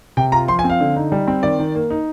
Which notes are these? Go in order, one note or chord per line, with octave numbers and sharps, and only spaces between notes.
C3 G5
F4 A#5
F3 C6
G#5
C4
F5
D3
D#4
G3
C4
D#3 D5
D#3
A#3
D#4